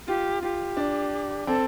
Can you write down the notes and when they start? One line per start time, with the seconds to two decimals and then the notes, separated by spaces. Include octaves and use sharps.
0.07 F4 G4
0.42 F4 G4
0.77 D4
1.47 C4 A4